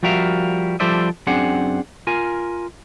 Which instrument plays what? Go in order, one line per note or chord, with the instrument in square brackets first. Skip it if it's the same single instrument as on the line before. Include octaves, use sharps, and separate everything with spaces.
[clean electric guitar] F3 G3 F#4 A#4 E5 F5
F3 G3 A4 C5 D5 E5
F#2 C4 D4 G#4 F#5
F4 A#4 G#5